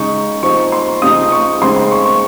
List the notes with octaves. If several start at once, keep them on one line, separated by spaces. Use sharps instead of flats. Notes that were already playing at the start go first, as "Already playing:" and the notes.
Already playing: C#3 G#3 D#4 C#6
F3 C4 D#4 C#6
C6
C#3 F3 C4 D#4 D#6
C#6
C#3 G#3 C4 D#4 C6
C6
C#6
C#6